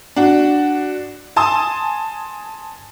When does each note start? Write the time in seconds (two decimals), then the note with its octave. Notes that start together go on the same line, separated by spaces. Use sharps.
0.16 D4 F#4
1.36 G#5 A5 C6 D#6